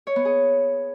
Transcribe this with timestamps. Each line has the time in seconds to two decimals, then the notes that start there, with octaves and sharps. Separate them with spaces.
0.07 C#5
0.16 B3
0.25 G#4